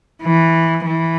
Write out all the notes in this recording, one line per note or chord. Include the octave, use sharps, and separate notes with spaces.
E3
E3